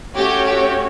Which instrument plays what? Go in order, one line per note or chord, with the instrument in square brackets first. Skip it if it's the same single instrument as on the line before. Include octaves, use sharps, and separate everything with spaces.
[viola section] A3 C#4 F#4 C#5 [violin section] G4
[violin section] G4